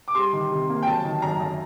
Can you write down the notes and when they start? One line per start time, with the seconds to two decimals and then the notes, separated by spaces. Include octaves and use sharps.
0.08 D6
0.15 G3 C6
0.33 D#3
0.51 C3
0.69 A#3
0.83 G5
0.87 F#3 A5
1.05 D#3
1.22 F#2 A#5
1.40 F#2